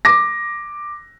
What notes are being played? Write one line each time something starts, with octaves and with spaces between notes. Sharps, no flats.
D6 A#6